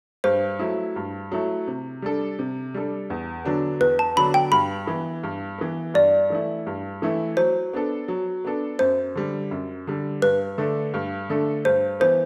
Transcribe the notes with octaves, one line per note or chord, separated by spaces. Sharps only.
G2 C5
F#3 A3 E4
G2
F#3 A3 E4
C3
G3 D4 A4
C3
G3 D4 A4
E2
D3 F#3 B3 D4
E2 B4
A5
D3 F#3 B3 D4 B5
G5
G2 B5
E3 B3
G2
E3 B3
G2 D5
E3 A3 E4
G2
E3 A3 E4
F#3 C5
B3 D4 A4
F#3
B3 D4 A4
F#2 C5
D3 G3
F#2
D3 G3
G2 B4
D3 A3 D4 A4
G2
D3 A3 D4 A4
G2 C5
E3 B3 C5